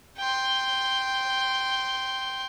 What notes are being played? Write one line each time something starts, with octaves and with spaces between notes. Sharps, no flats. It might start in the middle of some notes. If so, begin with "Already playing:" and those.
G5 C6